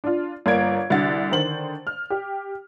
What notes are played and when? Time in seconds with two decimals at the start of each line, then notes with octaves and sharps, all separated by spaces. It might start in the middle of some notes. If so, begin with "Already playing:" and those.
0.04 D4 F4
0.46 G1 A#3 D5 G#6 D7
0.90 C2 D3 F#4 A6
1.31 D3 D#3 C5 F#7
1.87 F6
2.10 G4